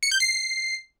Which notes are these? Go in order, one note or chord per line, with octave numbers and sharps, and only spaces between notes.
C#7
G6
C7